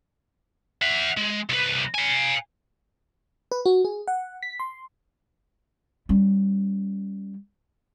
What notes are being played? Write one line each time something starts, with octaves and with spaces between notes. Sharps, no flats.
E5 F#5
G#3
C2 B4
F5 G#5
B4
F#4
G#4
F#5
B6
C6
G3 C#4